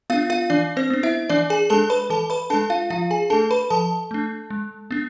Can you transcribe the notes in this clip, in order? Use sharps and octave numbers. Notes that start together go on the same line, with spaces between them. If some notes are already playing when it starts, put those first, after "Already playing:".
B3 D4 F4 F5
F4 F5
E3 D4 D5
C4 C5
B3 D4
E4 E5
E3 D4 D5
G#4 G#5
G#3 D4 A4 A5
B4 B5
E3 A4 A5
B4 B5
G#3 D4 A4 A5
F4 F5
F3 F4 F5
G#4 G#5
A3 D4 A4 A5
B4 B5
F3 A4 A5
A3 D4
G#3
B3 D4